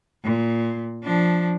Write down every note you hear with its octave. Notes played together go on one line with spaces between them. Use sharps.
A#2
F3 D4